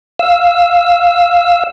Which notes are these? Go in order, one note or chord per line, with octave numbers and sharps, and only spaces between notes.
F5 E6